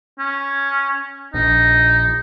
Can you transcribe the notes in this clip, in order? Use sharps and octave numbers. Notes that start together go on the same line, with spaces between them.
C#4
A#1 D#4